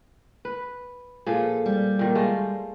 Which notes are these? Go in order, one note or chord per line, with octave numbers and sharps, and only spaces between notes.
B4
A#2 F3 G#4 A4
G3
A#2 D#3
G#3 A3 F4